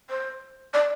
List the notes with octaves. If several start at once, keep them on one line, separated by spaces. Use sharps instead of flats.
C5
D5